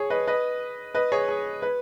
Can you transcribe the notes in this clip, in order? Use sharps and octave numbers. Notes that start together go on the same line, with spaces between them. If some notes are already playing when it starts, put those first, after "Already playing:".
Already playing: G#4 C#5
B4 D#5
B4 D#5
B4 D#5
G#4 C#5
G#4
B4